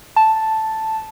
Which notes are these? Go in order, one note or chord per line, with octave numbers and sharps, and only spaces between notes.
A5